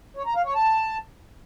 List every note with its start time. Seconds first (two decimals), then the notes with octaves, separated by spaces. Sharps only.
0.17 C#5
0.26 A#5
0.36 F5
0.45 C#5
0.55 A5